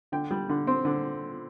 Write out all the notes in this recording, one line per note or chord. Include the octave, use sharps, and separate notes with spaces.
D3 G5
G3
D3
C4
D3